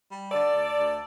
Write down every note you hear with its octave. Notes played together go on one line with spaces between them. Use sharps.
G3
D3 A4 D5
D2
D2